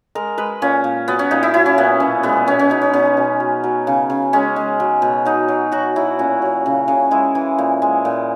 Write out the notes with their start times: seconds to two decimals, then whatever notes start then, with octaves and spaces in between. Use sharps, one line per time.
0.15 G#3 A#4
0.38 G#3 B4
0.62 A#2 C#4
0.84 A#2
1.08 F#3 B3
1.19 C#4
1.31 A#2 D#4
1.43 E4
1.54 F#3 E4
1.66 C#4
1.78 A#2 B3
2.00 B2 C#4
2.23 G#3 B3
2.47 B2 C#4
2.59 C#4
2.70 B2 D#4
2.82 C#4
2.93 B2 C#4
3.17 B2
3.40 F#3
3.64 F#3
3.87 C#3
4.10 C#3
4.33 G#3 C#4
4.56 G#3
4.80 F#3
5.02 B2
5.26 F#3 D#4
5.48 F#3
5.72 F#3 F#4
5.96 F#3 E4
6.19 A#2 C#4
6.42 F#3
6.66 C#3
6.88 C#3
7.11 G#3 E4
7.35 E3
7.58 A#2
7.82 G#3
8.05 A#2